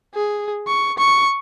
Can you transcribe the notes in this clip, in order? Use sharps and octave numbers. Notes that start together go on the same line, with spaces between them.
G#4
C#6
C#6